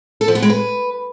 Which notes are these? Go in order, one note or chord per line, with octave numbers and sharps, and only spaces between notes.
A4
F3
B3
G#3
B4